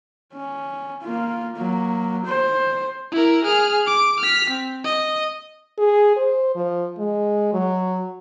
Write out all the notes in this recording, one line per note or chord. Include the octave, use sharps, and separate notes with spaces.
C#4
A#3 F4
F#3 A#3
C5
E4 A#4
G#4 F6
D6
F6 B6
C4
D#5
G#4
C5
F3
G#3
F#3